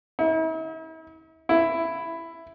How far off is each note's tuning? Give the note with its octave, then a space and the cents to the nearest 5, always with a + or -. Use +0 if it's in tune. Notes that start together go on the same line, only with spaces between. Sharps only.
E4 -45
E4 +10